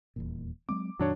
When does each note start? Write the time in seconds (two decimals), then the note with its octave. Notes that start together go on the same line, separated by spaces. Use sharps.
0.16 D#1 E2 A#2
0.69 F#3 G#3 C4 D6
0.99 F2 A#2 D#3 F#3 D4 C#5